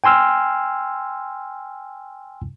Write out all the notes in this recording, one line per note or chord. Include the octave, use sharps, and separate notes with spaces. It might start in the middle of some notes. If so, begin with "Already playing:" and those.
G5 G#5 C6 E6 F6